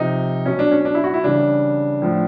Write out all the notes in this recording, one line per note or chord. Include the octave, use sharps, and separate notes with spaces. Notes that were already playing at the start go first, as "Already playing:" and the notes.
Already playing: C3 F3 D#4
B2 F#3 C#4
D4
C#4
D4
E4
F#4
E4
C#3 E3 G3 D4
A2 F3